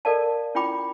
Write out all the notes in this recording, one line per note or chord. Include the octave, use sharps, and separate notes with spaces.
A4 A#4 D5 D#5 F5 A5
C#4 E4 F4 G5 B5 D6